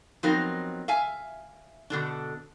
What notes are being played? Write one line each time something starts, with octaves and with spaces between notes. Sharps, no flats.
F3 F#3 B3 C4 D#4 A#4
E5 F5 G#5
B2 D3 D4